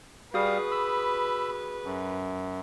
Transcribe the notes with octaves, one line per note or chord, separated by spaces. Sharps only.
G3 F#4 G#4 B4 F5 D#6
B5 E6
F#2